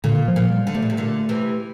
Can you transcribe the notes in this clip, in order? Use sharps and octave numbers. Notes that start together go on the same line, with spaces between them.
A#2 D3
F3
A#2
G3
D3
C3 A3
A#2
C3
A#2 D3
C3 E3